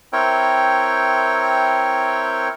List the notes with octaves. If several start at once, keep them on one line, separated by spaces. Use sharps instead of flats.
C4 E4 A#4 C#5 G5